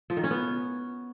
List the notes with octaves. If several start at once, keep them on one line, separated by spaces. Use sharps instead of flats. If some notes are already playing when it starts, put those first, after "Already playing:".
F3
D#3
C#4
B3